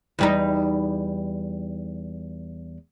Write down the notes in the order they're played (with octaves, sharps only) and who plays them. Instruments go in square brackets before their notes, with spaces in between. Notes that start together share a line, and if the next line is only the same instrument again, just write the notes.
[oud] E2 G3 D#4